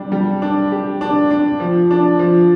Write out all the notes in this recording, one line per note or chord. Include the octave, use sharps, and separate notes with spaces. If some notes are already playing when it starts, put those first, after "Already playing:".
Already playing: G3 D4
G3
D4
G4
D4
D4
F3
D4
F3